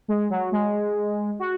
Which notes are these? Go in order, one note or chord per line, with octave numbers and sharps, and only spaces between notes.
G#3
F#3
G#3
F#4